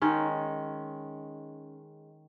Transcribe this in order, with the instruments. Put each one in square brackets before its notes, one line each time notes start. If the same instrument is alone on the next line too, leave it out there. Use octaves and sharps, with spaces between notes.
[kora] D#3 G#3 C#4